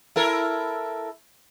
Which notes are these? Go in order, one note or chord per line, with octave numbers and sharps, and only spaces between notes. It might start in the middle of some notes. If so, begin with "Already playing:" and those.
E4 A4 A#4